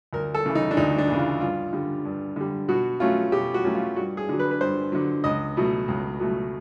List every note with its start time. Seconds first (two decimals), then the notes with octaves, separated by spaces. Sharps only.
0.13 D2 A#4
0.34 A4
0.46 C#3 E3
0.55 D#4
0.71 D4
0.77 D2 D#4
0.98 D4
1.08 C#3 E3
1.19 F4
1.41 G2 F4
1.73 D3 G3
2.05 G2
2.36 D3 G3
2.68 B2 F#4
3.00 F#3 A3 C#4 F4
3.32 B2 G4
3.54 F#4
3.64 F#3 A3 C#4
3.75 F4
3.96 G2 F#4
4.17 G#4
4.29 D3 F#3
4.39 B4
4.51 B4
4.61 G2 C5
4.92 D3 F#3
5.24 C#2 D#5
5.57 B2 F#3 A3
5.88 C#2
6.20 B2 F#3 A3